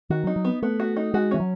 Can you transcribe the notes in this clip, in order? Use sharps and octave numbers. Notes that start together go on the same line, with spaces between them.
D#3 F#4
F#3
D#4
F#3
B3
A3 B3
F#4
D#4
G#3 F#4
E3 C#4
F#3